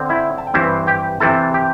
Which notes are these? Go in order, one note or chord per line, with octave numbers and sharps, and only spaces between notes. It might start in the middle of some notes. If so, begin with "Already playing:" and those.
Already playing: D3 C4
E4 E5
A5
G5
G2 E3 C4 E4 E5
G4 G5
C3 E3 C4 E4 A4 A5
G4 G5